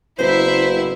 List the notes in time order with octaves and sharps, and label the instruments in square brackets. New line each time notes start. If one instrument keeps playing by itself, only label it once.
[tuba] F#1 [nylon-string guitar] F#2 B3 B4 [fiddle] E4 E5 [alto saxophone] C5